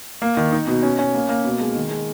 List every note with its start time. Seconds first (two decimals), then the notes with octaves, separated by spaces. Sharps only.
0.22 A#3
0.37 D#3
0.52 D#4
0.67 B2
0.83 C#4
0.99 C#4
1.14 A#3
1.29 A#3
1.44 B2
1.60 G#3
1.76 D#3
1.91 G#3